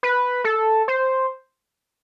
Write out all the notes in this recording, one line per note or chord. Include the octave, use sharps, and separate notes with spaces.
B4
A4
C5